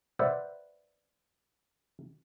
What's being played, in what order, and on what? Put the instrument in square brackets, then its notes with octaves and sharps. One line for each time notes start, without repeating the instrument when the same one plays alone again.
[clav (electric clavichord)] B4 C5 D5 E5 F#5